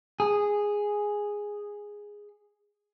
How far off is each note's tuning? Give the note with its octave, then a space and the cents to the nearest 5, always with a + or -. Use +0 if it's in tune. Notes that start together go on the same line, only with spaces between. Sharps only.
G#4 -5